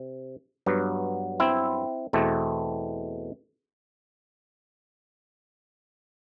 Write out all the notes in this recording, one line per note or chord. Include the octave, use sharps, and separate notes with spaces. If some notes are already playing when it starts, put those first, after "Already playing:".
Already playing: C3
G2 F#3 B3
C4 E4
E2 B2 A3 C4